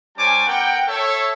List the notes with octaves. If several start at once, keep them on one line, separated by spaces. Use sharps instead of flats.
G3 C#4 C5 G#5 A5 D6
B3 A#4 F#5 G5
A4 C#5 E5